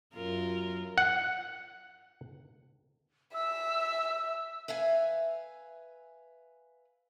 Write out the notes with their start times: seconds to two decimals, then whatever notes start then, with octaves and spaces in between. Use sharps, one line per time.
0.14 F#2 F4 A#4
0.98 F#5
3.34 E5 E6
4.68 B4 E5 F5 G#5